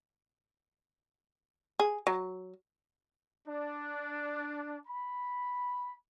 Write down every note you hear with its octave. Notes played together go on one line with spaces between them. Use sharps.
G#4
F#3
D4
B5